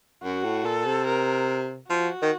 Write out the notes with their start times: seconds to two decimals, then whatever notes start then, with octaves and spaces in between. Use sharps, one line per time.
0.23 F#2 F#4
0.44 A2
0.64 A#2 A4
0.86 C3
1.06 A#4
1.89 F3 F#4
2.22 D#3